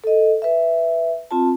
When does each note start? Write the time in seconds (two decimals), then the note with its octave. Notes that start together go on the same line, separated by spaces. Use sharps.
0.04 A4 D#5
0.42 B4 E5
1.31 C4 F4 A5